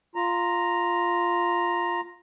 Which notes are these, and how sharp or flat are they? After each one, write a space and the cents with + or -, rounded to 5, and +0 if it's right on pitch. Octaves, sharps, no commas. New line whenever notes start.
F4 +0 A#5 +0